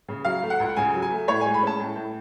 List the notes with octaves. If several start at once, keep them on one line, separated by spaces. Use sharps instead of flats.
C#3
F#3 F5
A3
F#5
C#2
C#3 G#5
F#3
G#5
A3
A2 C#5
G#3 G#5
B5
C#4 A5
A2
A2